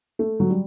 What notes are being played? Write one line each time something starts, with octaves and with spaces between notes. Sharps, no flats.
A3
F#3
G3